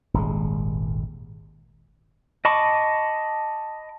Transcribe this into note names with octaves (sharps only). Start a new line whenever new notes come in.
D#1 G#1 G#3
D#5 A5 B5 C#6 D6